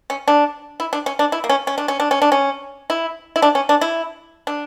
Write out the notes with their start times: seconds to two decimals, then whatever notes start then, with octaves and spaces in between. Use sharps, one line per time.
0.10 C#4
0.28 D4
0.80 E4
0.93 D4
1.06 C#4
1.19 D4
1.32 E4
1.44 A#3
1.49 C#4
1.67 C#4
1.78 D4
1.88 C#4
2.00 D4
2.11 C#4
2.22 D4
2.32 C#4
2.90 E4
3.36 E4
3.42 D4
3.55 C#4
3.69 D4
3.81 E4
4.47 D4